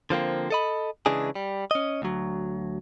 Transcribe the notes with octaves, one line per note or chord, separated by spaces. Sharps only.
D3 F3 A#3 C4
A4 D#5 B5
C#3 E3 G#3 D4 G#4
G3
C#4 D#5
D2 F#3